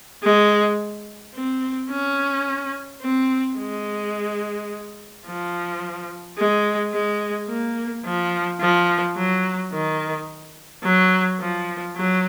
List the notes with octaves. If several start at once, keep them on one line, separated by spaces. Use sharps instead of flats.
G#3
C4
C#4
C4
G#3
F3
G#3
G#3
A#3
F3
F3
F#3
D#3
F#3
F3
F#3